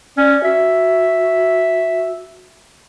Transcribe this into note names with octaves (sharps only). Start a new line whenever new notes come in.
C#4 D5
F#4 E5